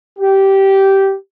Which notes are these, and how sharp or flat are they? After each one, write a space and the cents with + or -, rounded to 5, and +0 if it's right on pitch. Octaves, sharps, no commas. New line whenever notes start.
G4 -15